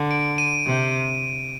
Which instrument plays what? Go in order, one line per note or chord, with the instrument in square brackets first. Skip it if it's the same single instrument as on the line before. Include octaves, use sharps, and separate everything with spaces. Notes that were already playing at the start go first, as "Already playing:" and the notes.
Already playing: [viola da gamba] D3
[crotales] D7
D#7
[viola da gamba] C3